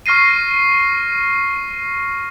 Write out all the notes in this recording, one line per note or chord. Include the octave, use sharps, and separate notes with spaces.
C#6 F6 A#6 C7 D#7